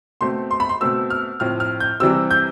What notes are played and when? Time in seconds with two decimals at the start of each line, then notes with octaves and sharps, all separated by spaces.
0.21 B2 A3 C4 C6
0.51 C6
0.60 B5
0.69 C6
0.81 B2 A3 C4 E6
1.10 F6
1.40 A2 F3 C4 F6
1.60 F6
1.80 G6
2.00 C3 E3 G3 C4 E6
2.31 G6